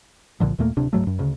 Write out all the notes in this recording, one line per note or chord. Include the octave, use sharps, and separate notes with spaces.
C2 A#2 D3 F3
D#2 A#2 A3 A#3
D1 C3 D4
D1 G#2 F#3 A3
F#2
D2 C#3